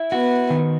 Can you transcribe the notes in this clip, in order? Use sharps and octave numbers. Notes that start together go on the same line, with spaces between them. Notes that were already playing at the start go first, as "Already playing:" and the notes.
Already playing: E4
B3 F#4
D#3